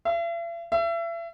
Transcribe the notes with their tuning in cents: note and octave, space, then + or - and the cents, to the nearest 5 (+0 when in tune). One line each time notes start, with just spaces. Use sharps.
E5 +45
E5 +35